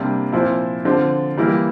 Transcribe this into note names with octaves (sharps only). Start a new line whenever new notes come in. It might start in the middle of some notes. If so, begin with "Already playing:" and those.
Already playing: C3 G3 A#3 D4
A#2 F3 C4 E4
D3 F3 C4
E3 G3 A#3 E4